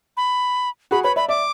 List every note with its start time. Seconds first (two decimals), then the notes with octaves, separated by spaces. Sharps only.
0.17 B5
0.91 F#4 G#4 B5
1.04 B4 C#5 B5
1.16 D5 E5 B5
1.28 D5 E5 D6